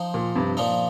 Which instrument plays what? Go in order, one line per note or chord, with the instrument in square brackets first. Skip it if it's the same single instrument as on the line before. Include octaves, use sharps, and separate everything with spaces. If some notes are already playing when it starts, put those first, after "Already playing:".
Already playing: [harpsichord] F3 D#4 C5
[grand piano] A#2
G2 C3
[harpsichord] A#2 F3 D#4